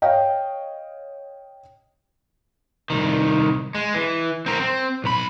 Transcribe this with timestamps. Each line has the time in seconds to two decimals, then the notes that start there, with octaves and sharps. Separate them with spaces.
0.02 C#5 D#5 F5 G5
2.90 C2 D#3
3.75 G#3
3.94 E3
4.46 C4 A#4
4.60 C4
5.04 B1 B5